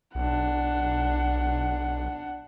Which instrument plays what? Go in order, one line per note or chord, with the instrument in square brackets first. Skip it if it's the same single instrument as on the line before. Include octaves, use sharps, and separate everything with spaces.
[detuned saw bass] B1 [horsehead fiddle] D4 F#5